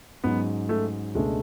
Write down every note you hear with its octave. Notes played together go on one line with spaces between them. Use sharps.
G#2 F#3 B3 C#4
A3
C#2 B2 G#3 A3 D4